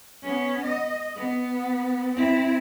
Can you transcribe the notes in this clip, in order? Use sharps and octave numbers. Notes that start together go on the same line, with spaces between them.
B3 C#4
D#5
B3
C4 E4